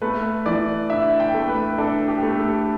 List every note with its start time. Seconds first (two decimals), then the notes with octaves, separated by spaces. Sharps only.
0.02 A3 B4
0.46 E3 D5
0.90 D4 E5
1.20 G5
1.34 A3
1.49 B4
1.78 D4 A4
2.08 G4
2.23 A3
2.38 A4